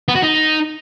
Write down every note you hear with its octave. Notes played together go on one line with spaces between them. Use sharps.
B3
F#4
D#4